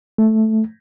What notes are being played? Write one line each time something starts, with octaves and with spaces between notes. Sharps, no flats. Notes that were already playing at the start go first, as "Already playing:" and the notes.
A3